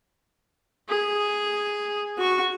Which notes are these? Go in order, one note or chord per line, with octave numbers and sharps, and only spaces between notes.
G#4
F#4 C#6